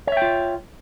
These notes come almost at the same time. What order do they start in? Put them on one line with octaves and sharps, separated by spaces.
C#5 E5 G5 F4